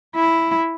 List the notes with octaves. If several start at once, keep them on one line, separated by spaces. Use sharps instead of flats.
E4